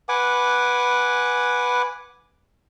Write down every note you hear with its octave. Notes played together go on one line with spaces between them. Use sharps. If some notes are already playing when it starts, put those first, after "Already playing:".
B4 F#5 G#5 D6